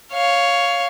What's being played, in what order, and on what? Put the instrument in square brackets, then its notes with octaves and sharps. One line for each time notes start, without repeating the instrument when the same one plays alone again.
[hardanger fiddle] C#5 F5